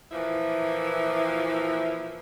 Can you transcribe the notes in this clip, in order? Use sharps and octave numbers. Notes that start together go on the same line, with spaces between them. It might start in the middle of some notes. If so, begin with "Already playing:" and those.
A#2 E3 F3 A#3 E4